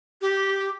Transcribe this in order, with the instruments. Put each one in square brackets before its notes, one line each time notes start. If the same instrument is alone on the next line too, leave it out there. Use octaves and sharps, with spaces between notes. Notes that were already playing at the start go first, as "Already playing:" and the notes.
[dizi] G4